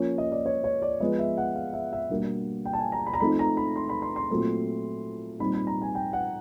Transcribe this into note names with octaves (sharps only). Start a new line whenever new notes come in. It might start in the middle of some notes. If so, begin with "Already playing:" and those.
Already playing: F3 A#3 C#4
D#5
D5
C#5
C#5
D5
F3 G#3 B3 D#5
E5
F#5
F5
E5
E5
B2 G3 A#3 D4
G5
A5
G#5
A#5
B5
A#5
F3 A3 C4 D#4 B5
A#5
B5
C6
B5
C6
C6
A#2 F#3 A3 C4
A#2 G3 C4 D#4 B5
B5
A#5
G#5
G5
F#5